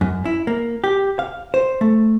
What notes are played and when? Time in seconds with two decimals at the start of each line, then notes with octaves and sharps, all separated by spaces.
0.01 F#2
0.25 E4
0.47 A#3
0.84 G4
1.19 F5
1.54 C5
1.81 A3